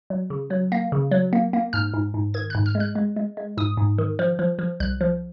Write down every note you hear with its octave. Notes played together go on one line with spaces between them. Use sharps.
F#3
C#3
F#3
A#3
C#3
F#3
A#3
A#3
G#2 F6
G#2
G#2
D#3 G#6
F#6
G#2
F6
G#3
F#6
G#3
G#3
G#3
G#2 D#6
G#2
D#3
F3
F3
F3
C2 F#6
F3